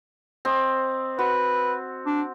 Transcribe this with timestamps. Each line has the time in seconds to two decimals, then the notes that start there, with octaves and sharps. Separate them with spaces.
0.45 C4 D#5
1.19 F#4 B4
2.06 D4